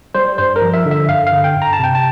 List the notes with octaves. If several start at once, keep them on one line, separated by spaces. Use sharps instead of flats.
G3 C5
G2 C5
A#4
F3
E5
D3
E5
G2 F5
F5
D3
G5
G2
A#5
A5
C3 G5
A5